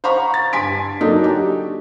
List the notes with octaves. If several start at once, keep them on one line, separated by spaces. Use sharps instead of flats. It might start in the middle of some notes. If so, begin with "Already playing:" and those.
C5 F5 F#5 A#5 B5 C#6
A6
G2 G#5 C6 B6 D7
F#3 A#3 D4 D#4 A4
F#4 G4